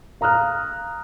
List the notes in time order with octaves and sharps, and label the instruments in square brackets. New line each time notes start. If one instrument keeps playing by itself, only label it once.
[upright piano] F5 A#5 D#6 F6 F#6